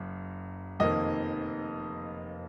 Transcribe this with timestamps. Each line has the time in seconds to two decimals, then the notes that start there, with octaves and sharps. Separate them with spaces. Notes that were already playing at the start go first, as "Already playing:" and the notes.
Already playing: F#1 F#2
0.79 F1 F2 D#3 A#3 D#4 D#5